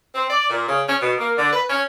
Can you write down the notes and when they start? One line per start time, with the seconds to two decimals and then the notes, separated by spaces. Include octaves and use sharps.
0.15 C4
0.30 D5
0.50 A#2
0.68 C#3
0.88 C#4
1.00 B2
1.18 A#3
1.37 D3
1.52 B4
1.69 C#4